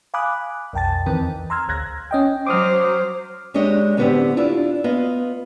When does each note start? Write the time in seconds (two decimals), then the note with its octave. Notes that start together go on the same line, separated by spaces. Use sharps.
0.14 F5 G#5 B5 D6 D#6 F#6
0.73 B1 F2 G5 A5 A6
1.06 D#3 E3 C4 A#4 B4
1.21 E2
1.50 A#5 C6 E6 F6 G#6
1.68 A1 D2 F#6 G#6 A#6
2.11 C#4 D#5 G5
2.47 F#3 C5 D6 D#6 F6
3.54 G#3 D4 G4 C#5 D#5
3.97 A2 D3 G3 B3 C4 G4
4.37 D4 E4 F4
4.84 B3 F4 D#5 F5